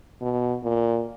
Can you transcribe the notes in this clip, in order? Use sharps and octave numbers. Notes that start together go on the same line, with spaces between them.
B2
A#2